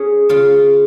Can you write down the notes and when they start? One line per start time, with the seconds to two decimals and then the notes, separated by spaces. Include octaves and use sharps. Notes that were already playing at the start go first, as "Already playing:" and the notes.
Already playing: C#4 G#4
0.29 C#3 F4